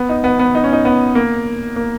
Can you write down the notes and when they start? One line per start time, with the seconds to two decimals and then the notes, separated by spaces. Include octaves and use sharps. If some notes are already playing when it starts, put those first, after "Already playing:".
Already playing: B3
0.09 D#4
0.24 B3
0.39 B3
0.55 D#4
0.64 C#4
0.73 D#4
0.85 B3
1.15 A#3
1.76 A#3